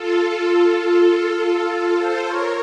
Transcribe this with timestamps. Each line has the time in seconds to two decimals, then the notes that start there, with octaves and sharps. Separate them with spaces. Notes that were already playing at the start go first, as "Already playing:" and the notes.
Already playing: F4 A4
0.50 F4 A4
1.08 F4 A4
1.38 F4 A4
1.95 A4 C5
2.25 A#4 C#5